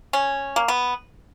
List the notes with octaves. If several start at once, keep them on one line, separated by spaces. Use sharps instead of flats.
C#4
A#3
B3